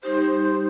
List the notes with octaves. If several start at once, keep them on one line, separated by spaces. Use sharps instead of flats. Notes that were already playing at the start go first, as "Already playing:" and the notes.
G3 D#4 G4 C5